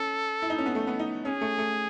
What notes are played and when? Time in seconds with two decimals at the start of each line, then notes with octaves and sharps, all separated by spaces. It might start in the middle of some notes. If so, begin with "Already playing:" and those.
Already playing: C#4 A4
0.42 E4
0.50 D#4
0.58 C#4
0.66 B3
0.75 A3
0.87 B3
0.99 D#4
1.25 C#4 G#4
1.41 A3
1.58 A3